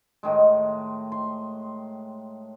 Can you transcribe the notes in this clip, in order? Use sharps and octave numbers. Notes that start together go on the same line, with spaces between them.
A2 D#3 G#3
C6